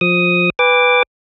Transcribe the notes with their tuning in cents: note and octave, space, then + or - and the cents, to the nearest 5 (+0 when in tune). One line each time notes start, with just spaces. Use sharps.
F3 +20 D#6 +5
B4 +0 G#5 -40 D6 +0